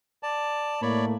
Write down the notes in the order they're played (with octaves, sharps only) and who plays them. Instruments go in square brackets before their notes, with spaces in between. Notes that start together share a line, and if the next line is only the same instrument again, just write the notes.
[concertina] D5 A5
[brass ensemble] A2 A3 A#3 [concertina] C#5 D5 B5